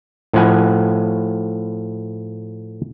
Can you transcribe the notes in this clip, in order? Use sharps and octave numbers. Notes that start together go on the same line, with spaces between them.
A2 F3 F#5 G#5